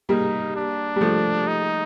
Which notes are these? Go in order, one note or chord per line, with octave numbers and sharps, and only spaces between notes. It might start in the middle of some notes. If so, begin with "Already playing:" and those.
G3 A#3 D#4
D4
G3
F3 A3
D#4